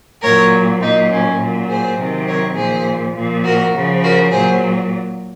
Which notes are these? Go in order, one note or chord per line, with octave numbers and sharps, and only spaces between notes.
A#2 F#3 A#4 C#5
A#2 F#3 C4 D#4
C#4
A#2 F#3
G#4 C5
C3 D#3 F#3
A#4 C#5
A#2 F3 G#4 C5
A#2 F3
F#4 A#4
C#3 F3
F#4 A#4
A#2 F#3 G#4 C5